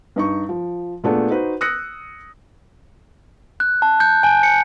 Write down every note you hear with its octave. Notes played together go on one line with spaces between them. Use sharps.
G2 D#4 C#6
F3
A#2 A3 B3 D4 G#4
D#4 F#4 B4 C5
D#6 E6 F#6 A#6 C#7
F#6
A5
G6
G#5
C#7